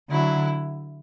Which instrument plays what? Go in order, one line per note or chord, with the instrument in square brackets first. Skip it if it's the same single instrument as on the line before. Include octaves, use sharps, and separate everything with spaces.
[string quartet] D3 F#3 [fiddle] E4